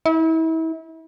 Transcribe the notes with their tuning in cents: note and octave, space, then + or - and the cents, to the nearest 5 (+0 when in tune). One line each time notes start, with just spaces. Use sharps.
E4 -35